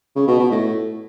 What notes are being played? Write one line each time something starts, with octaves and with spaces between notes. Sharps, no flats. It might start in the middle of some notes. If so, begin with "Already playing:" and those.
C#3
B2
B2
A2